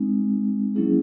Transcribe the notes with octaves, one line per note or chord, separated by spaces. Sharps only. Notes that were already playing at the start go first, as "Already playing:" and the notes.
Already playing: G#3 C4 D#4
F#3 A#3 C#4 E4 G#4